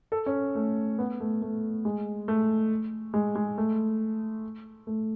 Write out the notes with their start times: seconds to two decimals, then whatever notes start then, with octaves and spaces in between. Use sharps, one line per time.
0.12 A4
0.26 C#4
0.55 A3
0.98 B3
1.20 A3
1.42 A3
1.85 G#3
2.28 A3
3.14 G#3
3.35 G#3
3.58 A3
4.87 A3